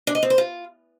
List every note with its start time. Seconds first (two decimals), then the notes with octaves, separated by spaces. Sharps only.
0.07 D4
0.15 D#5
0.23 C4
0.30 C5
0.38 F4